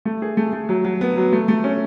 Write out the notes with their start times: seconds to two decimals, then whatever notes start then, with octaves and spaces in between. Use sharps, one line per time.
0.05 A3
0.22 G#4
0.37 A3
0.53 A3
0.69 F#3
0.85 F#3
1.01 B3
1.17 F#3
1.33 A3
1.48 A3
1.64 C#4